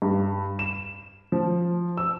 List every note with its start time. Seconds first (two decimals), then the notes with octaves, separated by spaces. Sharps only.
0.02 G2
0.59 E7
1.32 F3
1.97 E6